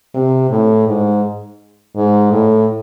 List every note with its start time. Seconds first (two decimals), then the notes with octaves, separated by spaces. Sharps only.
0.14 C3
0.50 A2
0.87 G#2
1.96 G#2
2.32 A2